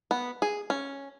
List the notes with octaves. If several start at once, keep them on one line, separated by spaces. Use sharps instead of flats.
B3
G#4
C#4